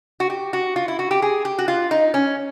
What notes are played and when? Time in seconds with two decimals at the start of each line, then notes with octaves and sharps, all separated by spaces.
0.20 F#4
0.30 G4
0.53 F#4
0.76 F4
0.88 E4
0.99 F#4
1.11 G4
1.22 G#4
1.45 G4
1.58 F#4
1.68 F4
1.91 D#4
2.14 C#4